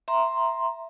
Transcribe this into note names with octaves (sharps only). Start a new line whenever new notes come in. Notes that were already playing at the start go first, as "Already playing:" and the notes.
E5 A#5 C6